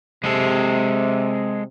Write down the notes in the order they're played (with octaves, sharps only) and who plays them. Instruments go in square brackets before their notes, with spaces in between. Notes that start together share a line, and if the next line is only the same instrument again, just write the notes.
[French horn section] C3 [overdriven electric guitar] G#3 A4